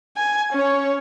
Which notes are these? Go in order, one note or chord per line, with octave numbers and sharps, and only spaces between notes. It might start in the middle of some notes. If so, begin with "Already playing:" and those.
G#5
C#4 C#5